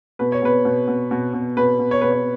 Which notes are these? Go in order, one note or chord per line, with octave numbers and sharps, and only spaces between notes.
B2 B4
C#5
B2 B4
B2
B2
B2
B2
B2 B4
B2
C#5
B2 B4
C#5